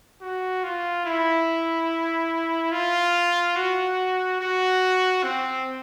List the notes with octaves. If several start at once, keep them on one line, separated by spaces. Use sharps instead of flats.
F#4
F4
E4
F4
F#4
F#4
C4